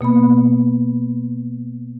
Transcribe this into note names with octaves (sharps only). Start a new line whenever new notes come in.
B2 A#3 B3 B5